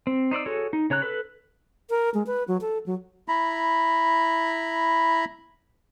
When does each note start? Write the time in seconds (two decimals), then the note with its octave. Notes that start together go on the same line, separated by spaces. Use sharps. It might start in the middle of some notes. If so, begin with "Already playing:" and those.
0.07 C4
0.31 D#4 C5 D5 E6
0.46 F#4 G#4 A4 C#5
0.73 D#4
0.90 C#3 C#5 A#5 F#6
1.02 A4 B4 B5
1.89 A#4
2.14 G#3
2.27 B4
2.48 F#3
2.61 A4
2.86 F#3
3.28 E4 A#5 B5